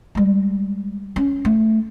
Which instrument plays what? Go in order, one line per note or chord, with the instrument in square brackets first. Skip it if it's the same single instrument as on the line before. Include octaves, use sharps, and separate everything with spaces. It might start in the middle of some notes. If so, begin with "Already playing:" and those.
[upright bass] G3 G#3
C#4
A3